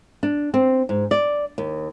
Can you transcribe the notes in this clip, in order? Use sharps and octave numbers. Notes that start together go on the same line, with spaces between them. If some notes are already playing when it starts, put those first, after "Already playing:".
D4
C4
G#2
D5
D#2